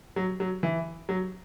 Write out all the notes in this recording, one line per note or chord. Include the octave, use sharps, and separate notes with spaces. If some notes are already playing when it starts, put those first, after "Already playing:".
F#3
F#3
E3
F#3